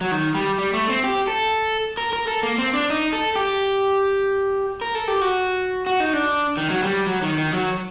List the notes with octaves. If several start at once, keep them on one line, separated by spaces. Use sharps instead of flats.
F#3
D#3
G3
G3
A3
C4
G4
A4
A#4
A#4
A4
A#3
C4
D4
D#4
A4
G4
A#4
A4
G4
F#4
F#4
D#4
D4
D#3
F#3
G3
F#3
D#3
D#3
F#3